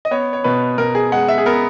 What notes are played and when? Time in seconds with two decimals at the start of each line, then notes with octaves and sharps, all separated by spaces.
0.05 D#5
0.11 B3 C#5
0.33 C#5
0.44 B2 B4
0.78 B2 A#4
0.95 G#4
1.12 G#3 F#5
1.28 E5
1.38 G#4
1.46 B3 A#4